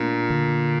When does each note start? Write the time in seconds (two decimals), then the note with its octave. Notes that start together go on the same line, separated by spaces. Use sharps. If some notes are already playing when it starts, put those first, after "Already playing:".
Already playing: A#2 A3 D4
0.30 D3